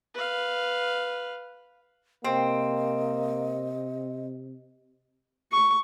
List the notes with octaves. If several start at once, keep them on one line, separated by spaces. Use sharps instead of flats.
B4 F5
C3 A#3 C4 D#5
C#6